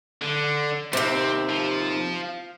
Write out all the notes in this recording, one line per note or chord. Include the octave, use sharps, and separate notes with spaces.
D3
D#2 C3 C4
F3